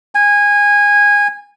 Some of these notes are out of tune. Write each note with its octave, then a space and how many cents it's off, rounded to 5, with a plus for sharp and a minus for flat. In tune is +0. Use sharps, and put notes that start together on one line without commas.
G#5 -20